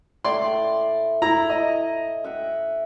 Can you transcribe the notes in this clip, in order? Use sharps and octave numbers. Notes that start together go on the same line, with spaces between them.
A2 D5 C6
E4 A#5
D#5
E5 F#5 G5